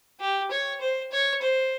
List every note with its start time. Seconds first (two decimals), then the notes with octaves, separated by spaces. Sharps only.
0.20 G4
0.51 C#5
0.80 C5
1.12 C#5
1.42 C5